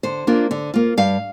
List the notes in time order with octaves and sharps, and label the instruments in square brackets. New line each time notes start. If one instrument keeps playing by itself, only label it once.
[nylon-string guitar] D3 C5
A#3 D4 F4
D3
A#3 F4
G2 F5